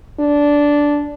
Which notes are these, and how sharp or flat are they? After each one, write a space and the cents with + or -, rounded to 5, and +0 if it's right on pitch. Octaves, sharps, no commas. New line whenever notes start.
D4 -10